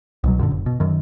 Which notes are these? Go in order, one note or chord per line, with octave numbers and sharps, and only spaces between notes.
C2 B2 F#3
F#2 A#2 D3
F#1
B2
F#2 D#3